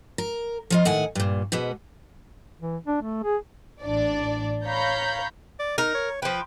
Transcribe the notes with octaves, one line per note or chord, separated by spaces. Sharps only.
A#4
F3 F4 D#5
A2 D#3 F#5 G#5
G2 A#2
G#2 B2 B3
E3
D4
A3
G#4
A1 D4 D5
C#5 F5 A#5 B5 G6
D5
D#4 A#4
C#5
F3 B4 G5